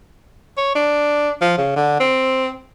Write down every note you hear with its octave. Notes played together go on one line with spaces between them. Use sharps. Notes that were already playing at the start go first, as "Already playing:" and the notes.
C#5
D4
F3
C#3
D3
C4